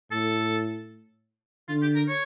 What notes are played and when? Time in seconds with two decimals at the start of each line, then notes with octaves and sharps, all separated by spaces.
0.11 A2 A4
1.68 D3 F4
1.82 G4
1.95 A#4
2.08 C#5